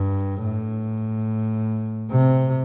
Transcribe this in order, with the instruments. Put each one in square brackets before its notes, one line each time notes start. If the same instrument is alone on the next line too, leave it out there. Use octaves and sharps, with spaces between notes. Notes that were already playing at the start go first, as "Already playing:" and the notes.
Already playing: [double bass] G2
A2
C3